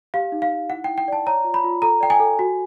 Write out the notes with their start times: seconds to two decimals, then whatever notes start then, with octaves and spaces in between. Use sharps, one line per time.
0.14 G4 F5
0.32 D#4
0.42 F5
0.52 D#4
0.70 E4 F#5
0.84 E4 G5
0.98 G5
1.08 D5 A5
1.27 C#5 A#5
1.44 F4
1.54 B5
1.64 F4
1.82 A4 A#5
2.00 D5 G5
2.10 G#5
2.20 A4
2.39 F#4